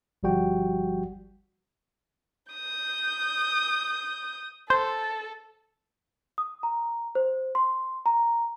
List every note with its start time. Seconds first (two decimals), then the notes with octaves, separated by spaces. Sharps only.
0.23 G1 F3 G3 F#4 G5
2.53 D#6 G6
4.70 A4 C5
6.38 D#6
6.63 A#5
7.15 C5
7.55 C6
8.06 A#5